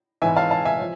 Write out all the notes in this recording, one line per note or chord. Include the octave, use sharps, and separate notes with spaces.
G#1 G#2 E3 E5 G#5
F5 A5
F5 A5
E5 G#5
F3